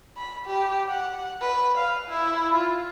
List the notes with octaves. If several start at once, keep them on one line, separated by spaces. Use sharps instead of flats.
B5
G4
F#5
B4
F5
E4
F4